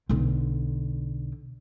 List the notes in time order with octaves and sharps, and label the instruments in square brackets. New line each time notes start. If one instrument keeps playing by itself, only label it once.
[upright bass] B1 D3